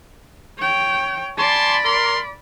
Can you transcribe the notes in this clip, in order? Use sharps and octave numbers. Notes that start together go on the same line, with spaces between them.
C#5 G5
D5 G#5 A5 B5 C6
A#4 C6